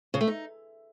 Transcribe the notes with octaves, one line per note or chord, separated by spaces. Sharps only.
C#3
A3
D#4